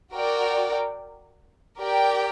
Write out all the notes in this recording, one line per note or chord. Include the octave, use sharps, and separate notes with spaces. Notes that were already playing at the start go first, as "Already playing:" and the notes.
F#4 A#4 D5 G5
G4 A#4 D5 G5